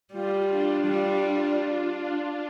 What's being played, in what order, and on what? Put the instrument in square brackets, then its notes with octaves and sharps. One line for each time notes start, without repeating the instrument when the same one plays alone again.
[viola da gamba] G3 [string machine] F4
[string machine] D4
[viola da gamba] G3 [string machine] D4